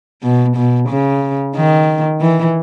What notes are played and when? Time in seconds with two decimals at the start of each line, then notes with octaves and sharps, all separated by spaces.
0.23 B2
0.56 B2
0.89 C#3
1.55 D#3
2.21 E3